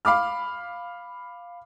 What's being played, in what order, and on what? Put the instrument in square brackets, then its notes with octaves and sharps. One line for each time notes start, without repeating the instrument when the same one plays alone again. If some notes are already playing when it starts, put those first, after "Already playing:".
[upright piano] F5 B5 D6 F6